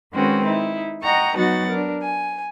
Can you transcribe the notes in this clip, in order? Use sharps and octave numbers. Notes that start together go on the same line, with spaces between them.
D#3 G#3 C4 C#4 F#4 B4
D#4 E4
D#5 F#5 G5 A#5 C#6
F#3 B3 D#4 F#4 F#5 A6
D4 A#4
G#5